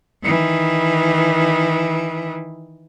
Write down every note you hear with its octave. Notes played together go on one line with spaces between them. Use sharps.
D#3 E3